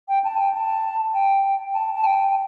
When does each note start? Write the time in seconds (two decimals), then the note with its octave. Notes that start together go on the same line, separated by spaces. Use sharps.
0.08 G5
0.24 A5
0.39 G5
0.54 A5
1.13 G5
1.74 A5
1.95 A5
2.04 G5